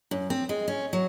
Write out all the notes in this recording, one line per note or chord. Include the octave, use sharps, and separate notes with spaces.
F#2
C4
G#3
C#4
F#3